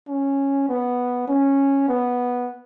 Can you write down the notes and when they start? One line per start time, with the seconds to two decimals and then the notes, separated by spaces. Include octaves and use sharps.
0.08 C#4
0.69 B3
1.28 C#4
1.88 B3